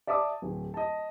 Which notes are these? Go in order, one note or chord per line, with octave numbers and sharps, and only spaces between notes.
D5 E5 A5 D6 D#6
D1
D#5 A5